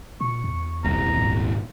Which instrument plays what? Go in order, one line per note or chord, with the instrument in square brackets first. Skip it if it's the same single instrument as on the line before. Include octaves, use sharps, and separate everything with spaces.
[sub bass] A#2 [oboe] C#6
[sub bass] E2
[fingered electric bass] D#1 C2 [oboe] A#5
[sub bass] G#2